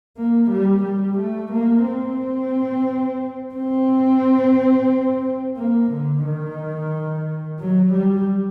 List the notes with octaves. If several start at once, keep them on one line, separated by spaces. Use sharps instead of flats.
A#3
G3
G3
A3
A#3
C4
C4
A#3
D3
D#3
F#3
G3